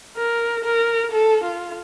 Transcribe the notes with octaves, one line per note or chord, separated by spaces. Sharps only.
A#4
A#4
A4
F4